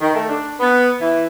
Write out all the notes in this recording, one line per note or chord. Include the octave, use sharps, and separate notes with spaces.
D#3
A3
D4
B3
E3